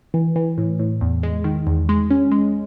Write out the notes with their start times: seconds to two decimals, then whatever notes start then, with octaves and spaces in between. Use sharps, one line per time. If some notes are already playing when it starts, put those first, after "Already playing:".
0.14 E3
0.36 E3
0.58 A2
0.79 A2
1.01 E2
1.23 G#3
1.44 D#3
1.67 E2
1.89 G#3
2.10 C#4
2.32 G#3